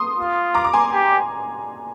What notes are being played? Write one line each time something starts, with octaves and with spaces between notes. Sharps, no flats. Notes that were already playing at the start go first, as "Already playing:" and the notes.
Already playing: C6 D#6
F4
A#5 D6
D6
G#5 C6
G4